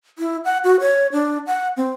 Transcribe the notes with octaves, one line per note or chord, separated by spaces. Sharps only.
E4
F#5
F#4
C#5
D4
F#5
C4